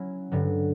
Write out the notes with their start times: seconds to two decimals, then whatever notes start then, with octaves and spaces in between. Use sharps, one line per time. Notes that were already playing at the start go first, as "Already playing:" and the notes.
Already playing: F#3 C#4 E4
0.32 G2 D3 F#3